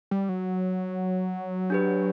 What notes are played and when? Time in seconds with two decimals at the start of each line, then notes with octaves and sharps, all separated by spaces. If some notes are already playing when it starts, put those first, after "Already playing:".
0.11 G3
0.29 F#3
1.70 D4 G4 B4